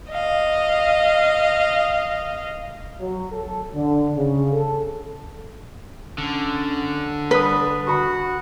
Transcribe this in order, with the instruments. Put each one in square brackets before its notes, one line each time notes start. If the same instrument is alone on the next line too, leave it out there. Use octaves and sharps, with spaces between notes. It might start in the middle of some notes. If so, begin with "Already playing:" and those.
[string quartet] D#5 F5
[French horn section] F#3
A4
D3
C#3
A4
[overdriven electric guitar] D3 [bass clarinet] C#4
[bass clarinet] G3 [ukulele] B4 [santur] B5 D#6
[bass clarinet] F#4 [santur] B5 C#6